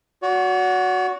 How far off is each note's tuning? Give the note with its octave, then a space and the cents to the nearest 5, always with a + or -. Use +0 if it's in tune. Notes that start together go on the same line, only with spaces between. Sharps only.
F#4 -5 D5 -45